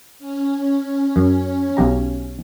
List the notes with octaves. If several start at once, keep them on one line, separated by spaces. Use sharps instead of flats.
C#4
F#2
B1 G4 A#5